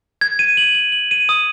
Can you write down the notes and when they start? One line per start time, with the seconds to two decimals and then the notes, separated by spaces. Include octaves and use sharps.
0.21 G#6
0.39 D#7
0.57 F#7
0.75 F#7
0.92 F#7
1.11 D#7
1.29 D#6